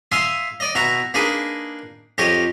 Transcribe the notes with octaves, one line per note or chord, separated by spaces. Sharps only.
E5 F5 G#5 C6 D#6
D5 D#5
B2 E4 F#4 A#5
A#3 D4 D#4 G#4 B4
F2 G4 C#5 D#5